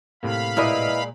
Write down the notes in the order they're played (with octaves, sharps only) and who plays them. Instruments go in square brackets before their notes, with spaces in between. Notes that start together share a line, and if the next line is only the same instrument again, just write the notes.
[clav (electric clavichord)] A2 C3 A#3 [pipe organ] F5 B5
[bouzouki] A#2 G#3 D5 [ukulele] E4 B4 D#5